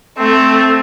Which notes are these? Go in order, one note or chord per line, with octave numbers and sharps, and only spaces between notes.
A3 C4